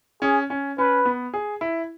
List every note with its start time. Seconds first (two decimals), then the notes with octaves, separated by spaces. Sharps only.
0.22 C#4 G#4
0.50 C#4
0.78 C#4 B4
1.05 B3
1.34 G#4
1.61 E4